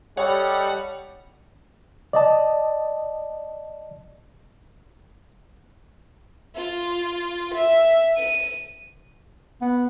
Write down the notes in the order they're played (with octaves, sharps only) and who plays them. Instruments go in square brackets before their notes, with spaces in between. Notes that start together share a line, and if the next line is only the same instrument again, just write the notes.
[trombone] G3 [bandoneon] G4 A4 D#5 [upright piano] C#5 [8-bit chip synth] F#5
[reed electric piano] D5 D#5 A5
[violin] F4
E5
D#7
[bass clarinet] B3